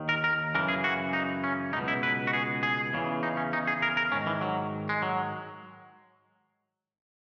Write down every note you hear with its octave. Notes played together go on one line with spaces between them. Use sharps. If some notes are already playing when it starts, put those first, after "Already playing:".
Already playing: D#2 D#3
A#4
A#4
F#2 C#3 E3 A#4
G#4
F#4
D#4
C#4
C#2 B2 D#4
E4
B4
F#4
G#4
G#4
E2 C#3 E3
D#4
C#4
D#4
G#4
A#4
A#4
G#2 D#3 C#4
E3
F#3
G#3
F#3